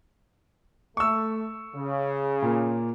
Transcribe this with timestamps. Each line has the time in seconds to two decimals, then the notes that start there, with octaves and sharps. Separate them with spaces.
0.97 A3 C#6 E6
1.75 C#3
2.42 A#2 A#3